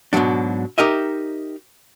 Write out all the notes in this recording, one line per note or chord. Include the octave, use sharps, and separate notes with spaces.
G#2 B2 D#3 F#3 D4
D#4 G4 A#4 D#5 E5